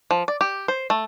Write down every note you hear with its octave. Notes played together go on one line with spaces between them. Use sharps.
F3
D5
G4
C5
A3